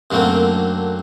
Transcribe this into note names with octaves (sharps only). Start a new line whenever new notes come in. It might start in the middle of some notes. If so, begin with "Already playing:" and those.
F#2 D3 F#3 A3 A#3 C4